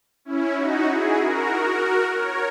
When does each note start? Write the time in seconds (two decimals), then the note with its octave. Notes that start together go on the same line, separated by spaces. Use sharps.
0.25 C#4 E4
0.57 D#4 F#4
0.88 E4 G#4
1.19 F#4 A#4
2.14 A#4 C#5